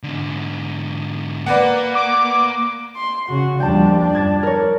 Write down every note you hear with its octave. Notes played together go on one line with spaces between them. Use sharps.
G#2 D3
A#3 B4 D5 F#5
D6
C6
C#3 F#4
D#2 F3 G3 D4 G5 A5
F#2 A5 G#6 A6
A#4 C#5